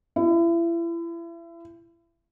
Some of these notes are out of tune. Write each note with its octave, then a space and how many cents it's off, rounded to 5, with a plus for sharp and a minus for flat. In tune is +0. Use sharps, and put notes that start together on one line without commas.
E4 +35